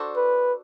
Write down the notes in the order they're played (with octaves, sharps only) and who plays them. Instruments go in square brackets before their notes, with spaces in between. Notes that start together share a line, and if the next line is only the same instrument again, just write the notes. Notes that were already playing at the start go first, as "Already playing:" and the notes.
Already playing: [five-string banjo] D4 F#4 A4 C5
[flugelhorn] B4